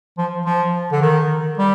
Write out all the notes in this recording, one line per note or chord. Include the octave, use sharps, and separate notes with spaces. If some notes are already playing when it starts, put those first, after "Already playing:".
F3
F3
D3
D#3
G3